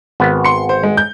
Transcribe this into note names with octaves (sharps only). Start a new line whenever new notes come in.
G#1 B3
C6 C#7
C5
G#3
G6